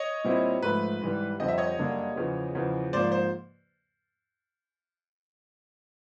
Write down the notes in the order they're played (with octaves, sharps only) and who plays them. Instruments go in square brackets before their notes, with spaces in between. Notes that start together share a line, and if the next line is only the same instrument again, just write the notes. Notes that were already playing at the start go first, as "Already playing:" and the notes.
Already playing: [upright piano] C#5 D#5
[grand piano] A#2 G3 C4 E4
[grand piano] G#2 F3 A3 [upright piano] B4
[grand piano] G#2 E3 G3
[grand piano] F2 D3 G3 C4 [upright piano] D#5
[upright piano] E5
C#5 D#5
[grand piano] F#2 D3 G3 A#3 D4
E2 C#3 F3
E2 C#3 F3
[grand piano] G#2 F3 A#3 [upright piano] C5 D5
[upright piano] C5